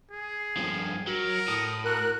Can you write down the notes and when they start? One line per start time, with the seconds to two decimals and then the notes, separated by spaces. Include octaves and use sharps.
0.11 G#4
0.57 G2 F3
1.07 F#3 A#4
1.48 A2 D#6
1.85 F#4 A#4 F#6